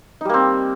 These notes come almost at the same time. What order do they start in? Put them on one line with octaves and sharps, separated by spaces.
D#4 G3 A#3 C4